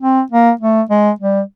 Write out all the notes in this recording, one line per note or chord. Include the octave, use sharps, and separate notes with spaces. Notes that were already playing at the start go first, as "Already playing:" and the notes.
C4
A#3
A3
G#3
G3